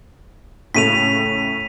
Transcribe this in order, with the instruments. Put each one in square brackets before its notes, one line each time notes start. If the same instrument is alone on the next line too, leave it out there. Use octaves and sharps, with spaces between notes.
[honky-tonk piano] A2 C#3 A3 [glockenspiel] B6 D#7 F7